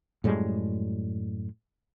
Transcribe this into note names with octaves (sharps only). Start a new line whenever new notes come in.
F#2 A2 G3 G#3